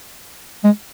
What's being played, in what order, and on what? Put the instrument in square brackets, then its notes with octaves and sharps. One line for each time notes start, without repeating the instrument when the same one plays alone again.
[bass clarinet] G#3